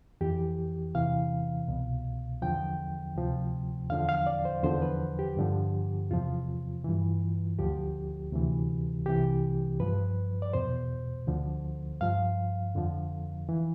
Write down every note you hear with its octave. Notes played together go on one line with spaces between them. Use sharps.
F2 E3 G4
E2 C3 E3 F5
C2 B2
E2 D3 F3 G5
D2 C3 F3
E2 D3 F3 F5
F5
D5
C5
E2 D3 F3 C5
B4
G4
G2 D3 F3
E2 C3 F3 F4
G2 E3
D2 D3 F3 G4
D2 C3 E3
C2 C3 E3 G4
G2 F3 B4
D5
E2 B2 C5
D2 D3 F3
G2 F3 F5
F2 D3 F3
E3